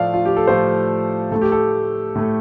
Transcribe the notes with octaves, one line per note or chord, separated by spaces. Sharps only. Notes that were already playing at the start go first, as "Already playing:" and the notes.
Already playing: A2 F3 A3 D5 F5
F4
G4
A4
A2 F3 A3 C5
A2 A3 A4
G4
A4
A2 A3